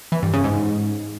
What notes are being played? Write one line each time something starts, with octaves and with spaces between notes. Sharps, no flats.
E3
G2
C#3
G#2